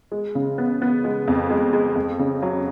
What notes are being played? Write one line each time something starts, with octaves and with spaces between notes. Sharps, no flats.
G#3
C#3
B3
B3
G#3
F2
G#3
G#3
F2
C#3
F#3